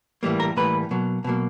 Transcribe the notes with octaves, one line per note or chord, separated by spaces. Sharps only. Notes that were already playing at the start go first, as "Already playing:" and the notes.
A2 E3 G3 A#3
A#4
A2 E3 G3 A#3 B4
B2 F#3 A#3
B2 F#3 A#3